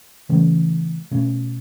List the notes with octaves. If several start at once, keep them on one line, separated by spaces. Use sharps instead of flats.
C#3 E3 A3 C#4
B2 A3 C#4